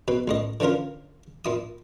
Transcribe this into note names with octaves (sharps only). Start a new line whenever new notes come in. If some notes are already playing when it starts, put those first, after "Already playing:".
B2 B4
C#2 A2 D#5
D3 E3 C#4 F4 A#4
A#2 E4 D#6